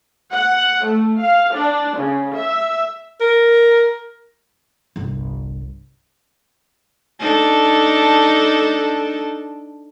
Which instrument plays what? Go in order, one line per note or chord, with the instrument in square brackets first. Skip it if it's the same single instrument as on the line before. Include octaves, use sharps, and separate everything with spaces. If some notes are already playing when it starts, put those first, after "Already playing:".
[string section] F#5
A3
F5
D4
C#3
E5
[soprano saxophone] A#4
[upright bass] G1 C2
[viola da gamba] D4 D#4 A4